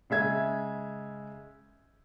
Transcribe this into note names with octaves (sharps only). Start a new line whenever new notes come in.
C#3 G#3 E5 G#6